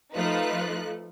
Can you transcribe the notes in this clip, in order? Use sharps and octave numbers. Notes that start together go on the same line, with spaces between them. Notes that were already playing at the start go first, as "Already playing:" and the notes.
F3 A3 D#4 F4 B4 F#6